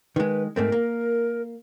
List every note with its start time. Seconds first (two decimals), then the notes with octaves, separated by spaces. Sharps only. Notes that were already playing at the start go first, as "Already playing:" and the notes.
0.16 D#3 G#3 B4
0.56 G#2 A3 C4 A#4
0.72 A#3